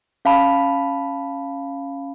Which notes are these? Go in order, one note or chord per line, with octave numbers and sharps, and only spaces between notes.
C#4 F5 A5 B5